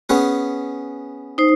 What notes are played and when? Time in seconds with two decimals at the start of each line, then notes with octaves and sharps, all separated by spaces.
0.09 B3 C#4 G#4
1.38 D#4 C5